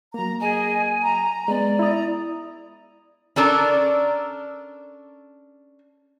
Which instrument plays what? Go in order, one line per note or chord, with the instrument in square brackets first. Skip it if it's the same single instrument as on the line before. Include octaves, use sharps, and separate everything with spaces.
[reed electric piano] F#3 A#3 [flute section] A#5
[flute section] G#4 D#5 [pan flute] G#5
[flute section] A#5
[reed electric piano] G#3 B3 [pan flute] D5
[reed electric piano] E4 D#6 [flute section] A#5
[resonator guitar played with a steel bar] C#4 D4 A4 A#4